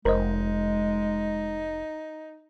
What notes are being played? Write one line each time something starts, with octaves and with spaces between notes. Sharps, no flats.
F1 G#3 D#4 A#4 C5 D#5